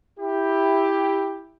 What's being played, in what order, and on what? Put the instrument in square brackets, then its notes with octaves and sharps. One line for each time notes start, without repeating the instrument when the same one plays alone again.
[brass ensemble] E4 G4